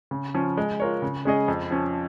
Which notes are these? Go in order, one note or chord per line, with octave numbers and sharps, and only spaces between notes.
C#3
F3 C#4
G#3
F4 A#4 C#5
C#3
G#3 C#4 G#4 D#5
F2
F3 C#4